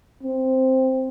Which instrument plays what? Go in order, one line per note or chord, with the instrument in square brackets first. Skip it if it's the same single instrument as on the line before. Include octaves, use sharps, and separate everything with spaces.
[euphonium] C4